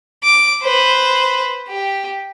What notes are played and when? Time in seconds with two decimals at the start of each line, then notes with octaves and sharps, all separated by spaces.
0.23 D6
0.62 B4 C5
1.68 G4